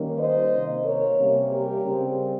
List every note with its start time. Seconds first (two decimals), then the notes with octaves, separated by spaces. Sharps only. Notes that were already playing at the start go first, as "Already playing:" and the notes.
Already playing: D#3 G3 A#3 C#4
0.18 C5 D#5
0.52 C3 D#3 A#3
0.85 A#4 C#5
1.18 C3 G3 A#3 C#4
1.51 G4 A#4
1.83 C#3 G3 C4